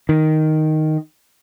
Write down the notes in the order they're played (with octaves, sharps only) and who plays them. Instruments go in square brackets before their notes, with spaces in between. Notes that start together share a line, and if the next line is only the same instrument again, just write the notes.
[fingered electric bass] D#3